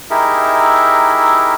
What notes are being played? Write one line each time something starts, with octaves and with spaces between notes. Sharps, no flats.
D#4 E4 G4 G#4 A#4 E5